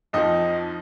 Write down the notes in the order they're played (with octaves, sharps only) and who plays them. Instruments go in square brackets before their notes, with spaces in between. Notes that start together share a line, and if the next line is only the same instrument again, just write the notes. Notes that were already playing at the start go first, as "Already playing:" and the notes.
[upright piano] F2 F3 D#4 D#5